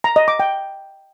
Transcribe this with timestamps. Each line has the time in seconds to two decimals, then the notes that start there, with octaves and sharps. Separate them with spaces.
0.04 A#5
0.16 D#5
0.28 D6
0.40 G5